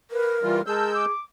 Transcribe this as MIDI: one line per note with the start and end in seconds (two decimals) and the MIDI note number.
0.11 0.61 70
0.11 0.37 71
0.43 0.61 52
0.43 0.61 55
0.43 0.61 65
0.43 0.61 89
0.66 1.05 56
0.66 1.11 68
0.66 0.91 70
0.66 0.91 81
0.66 1.05 88
0.66 1.05 91
0.93 1.20 86